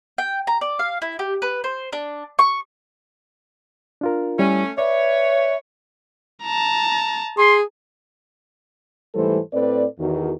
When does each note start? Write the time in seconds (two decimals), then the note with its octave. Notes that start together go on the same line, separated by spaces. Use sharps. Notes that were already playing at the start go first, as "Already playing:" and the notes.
0.18 G5
0.47 A#5
0.61 D5
0.79 F5
1.02 E4
1.19 G4
1.42 B4
1.64 C5
1.93 D4
2.39 C#6
4.01 D4 F4 A#4
4.39 G3 A3 C#4 E4
4.78 B4 C#5 D5 E5
6.44 A5 A#5
7.37 G#4 C6
9.15 G#2 E3 G3 A3 A4 C5
9.54 A2 C4 A4 B4 D5
9.99 E2 D#3 F#4